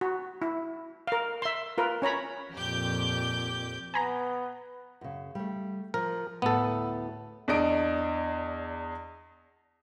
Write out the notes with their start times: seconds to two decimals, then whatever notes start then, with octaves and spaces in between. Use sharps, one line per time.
0.01 F#4
0.42 E4
1.07 A#4 F5
1.42 E5 C6
1.78 F4 A#4 B4
2.02 C#4 C#5 A#5 B5
2.53 F2 A#2 G4 D6 G6
3.94 B3 G#5 A#5 B5
5.01 F#2 C#3
5.35 G3 A3
5.94 F3 A#4
6.42 D2 A2 B3 A4
7.48 E2 D4 D#5 D7